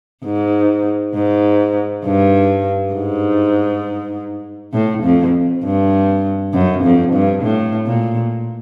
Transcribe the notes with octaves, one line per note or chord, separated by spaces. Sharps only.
G#2
G#2
G2
G#2
A2
F2
G2
F#2
F2
G2
A2
A#2